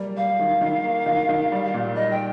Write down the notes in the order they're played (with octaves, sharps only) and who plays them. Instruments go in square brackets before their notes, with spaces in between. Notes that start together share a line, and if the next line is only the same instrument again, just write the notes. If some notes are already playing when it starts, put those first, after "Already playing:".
Already playing: [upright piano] G3 A#3
[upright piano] G3 [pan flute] F5
[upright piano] D#3
D#3
A#3
D#3
D#3
G3
A#2
[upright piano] G3 [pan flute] D#5
[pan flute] G5